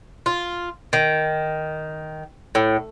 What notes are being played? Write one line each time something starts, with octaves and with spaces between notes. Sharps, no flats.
F4
D#3
A2